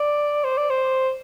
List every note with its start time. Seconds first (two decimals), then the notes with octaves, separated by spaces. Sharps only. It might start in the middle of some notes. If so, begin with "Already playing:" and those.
Already playing: D5
0.44 C5
0.57 D5
0.70 C5